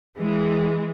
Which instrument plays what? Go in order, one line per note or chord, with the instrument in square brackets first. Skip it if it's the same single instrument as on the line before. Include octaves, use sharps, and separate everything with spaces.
[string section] E3 G#3